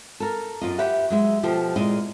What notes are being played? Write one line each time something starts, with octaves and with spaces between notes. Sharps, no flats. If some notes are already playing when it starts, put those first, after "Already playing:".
A4 A#4
F#2 F4 D#5
G4 B4 E5 F#5
F#3 G#3 E5
B2 F3 G4 A4
A#2 G#3 E4 D#5